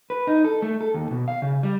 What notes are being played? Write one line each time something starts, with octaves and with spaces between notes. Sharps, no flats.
B4
D#4
A4
A3
A4
D#2
B2
F5
C#3
G3